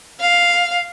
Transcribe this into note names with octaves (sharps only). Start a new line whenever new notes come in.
F5